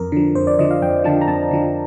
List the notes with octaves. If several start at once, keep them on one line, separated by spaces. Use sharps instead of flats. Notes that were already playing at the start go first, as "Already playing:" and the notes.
Already playing: F2 A#4
D3 F3
F2 C5
D5
D3 F3 D#5
F5
F2 G5
D3 F3 A5
A#5
F2 A5
D3 F3